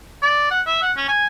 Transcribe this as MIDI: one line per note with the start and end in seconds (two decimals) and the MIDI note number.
0.22 0.49 74
0.51 0.61 78
0.67 0.80 76
0.82 0.92 78
0.97 1.04 61
1.08 1.27 80